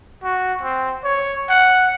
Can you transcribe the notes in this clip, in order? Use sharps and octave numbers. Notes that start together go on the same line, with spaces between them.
F#4
C4
C#5
F#5